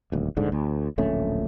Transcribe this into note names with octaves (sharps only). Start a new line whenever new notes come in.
D#1 D2
D#1 G#2 D3
D2
D1 A#1 A3 C#4